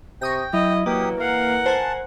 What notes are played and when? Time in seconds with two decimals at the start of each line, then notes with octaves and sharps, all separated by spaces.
0.22 C3 G5 C#6 D#6 A#6
0.53 F#3 E4 D#5
0.86 E3 F#3 A#3 G4 D#6
1.20 A#4 F5 F#5
1.66 C5 G#5 A5 F#6